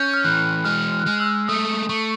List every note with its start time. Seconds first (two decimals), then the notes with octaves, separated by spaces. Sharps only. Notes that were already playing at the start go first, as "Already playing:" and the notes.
Already playing: C#4 G6
0.14 F6
0.24 E3 F#6
0.65 G#3 F6
0.92 F6
1.00 F#6
1.06 G#3 F6
1.20 E6
1.48 A3 D#6
1.89 A3 C#6